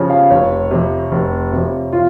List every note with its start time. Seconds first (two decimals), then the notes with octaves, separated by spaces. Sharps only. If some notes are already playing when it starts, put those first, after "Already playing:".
Already playing: C#3 F3 G4 C#5
0.10 F5
0.31 F1 C#5
0.71 F2 C3
1.12 F1
1.52 F2 C3
1.92 F4